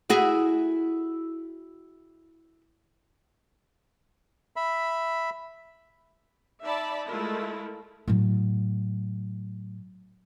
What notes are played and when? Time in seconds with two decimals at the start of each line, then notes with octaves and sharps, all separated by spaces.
0.10 E4 F#4 G#4
4.56 E5 B5
6.64 D#4 D5 E5 A5 B5
7.08 G#3 A3 E4 F4 A#4
8.08 A2 F#3